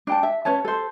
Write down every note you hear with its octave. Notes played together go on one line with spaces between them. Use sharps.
D4 G5 A5
E5
C#4 B4 C#5 A5
A4 C5